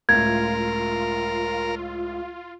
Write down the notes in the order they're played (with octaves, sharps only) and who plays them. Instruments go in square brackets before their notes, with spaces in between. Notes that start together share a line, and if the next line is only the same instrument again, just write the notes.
[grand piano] C#2 A2 [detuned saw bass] F4 [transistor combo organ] A#4 [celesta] G#6